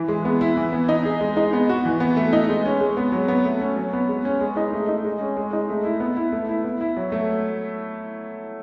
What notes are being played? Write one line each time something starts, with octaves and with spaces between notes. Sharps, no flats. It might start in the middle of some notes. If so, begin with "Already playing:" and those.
Already playing: E3
G#3
B3
E4
E3
B3
D#4
G#4
G#3
D#4
B3
F#4
E3
B3
A3
D#4
G#3
C#4
G#3
B3
F#3
B3
A3
C#4
F#3
B3
G#3
C#4
G#3
D#4
A3
D#4
G#3
C#4
G#3
D#4
A3
E4
B3
E4
A3
E4
B3
E4
F#3
A3